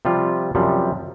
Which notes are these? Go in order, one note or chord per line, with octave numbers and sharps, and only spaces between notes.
C3 F3 G3 F4
F#2 C3 F3 G3